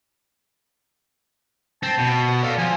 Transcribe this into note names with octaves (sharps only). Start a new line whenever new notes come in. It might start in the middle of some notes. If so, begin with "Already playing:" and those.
C4 A5
B2
A4 D5 F5
F3 G#5